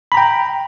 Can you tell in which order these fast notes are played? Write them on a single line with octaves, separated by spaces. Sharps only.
B5 A#5 G5